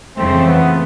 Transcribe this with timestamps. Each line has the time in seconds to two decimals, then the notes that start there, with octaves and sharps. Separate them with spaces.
0.17 F2 C#3 E3 A3 C4
0.47 B3